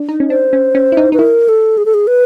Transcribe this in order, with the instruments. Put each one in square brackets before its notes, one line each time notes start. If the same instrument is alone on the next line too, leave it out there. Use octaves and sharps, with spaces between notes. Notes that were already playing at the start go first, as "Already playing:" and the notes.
Already playing: [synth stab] D4
D#4
C#4
[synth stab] D4 [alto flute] C5
[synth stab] C#4
C#4
E4
D#4
[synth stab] D#4 [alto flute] B4
[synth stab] E4 [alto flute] A#4
[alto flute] A4
G#4
A4
G#4
B4